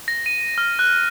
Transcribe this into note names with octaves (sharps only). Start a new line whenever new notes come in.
A#6
D#7
F6
F#6